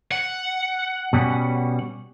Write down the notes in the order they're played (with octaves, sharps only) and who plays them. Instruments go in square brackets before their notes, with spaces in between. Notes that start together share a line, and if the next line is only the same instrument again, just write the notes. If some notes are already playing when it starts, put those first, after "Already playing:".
[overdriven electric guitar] F#5
[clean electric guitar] B2 G3 C#4